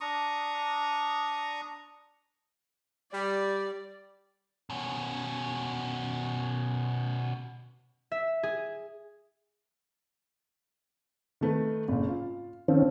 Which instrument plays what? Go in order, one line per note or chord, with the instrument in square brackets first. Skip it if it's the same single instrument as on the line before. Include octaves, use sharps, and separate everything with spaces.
[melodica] D4 A#5 C#6 D#6
[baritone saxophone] G3 [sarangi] D5
[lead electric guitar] B2 C#4
[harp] E5
G#4
[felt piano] D#3 A3 B4
F#1 A#2
F4
[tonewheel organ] D#3 C4 C#4 [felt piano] F3